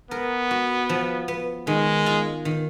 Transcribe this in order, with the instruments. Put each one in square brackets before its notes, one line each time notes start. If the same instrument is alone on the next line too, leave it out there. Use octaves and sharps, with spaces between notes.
[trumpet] B3 [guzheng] A#4
[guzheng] F#4
F3
B3
[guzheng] D#3 [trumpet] G#3
[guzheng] F4
D#3